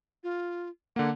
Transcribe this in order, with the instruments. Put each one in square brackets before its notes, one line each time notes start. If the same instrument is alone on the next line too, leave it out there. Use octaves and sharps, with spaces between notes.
[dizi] F4
[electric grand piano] D3 A#3 [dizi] F#5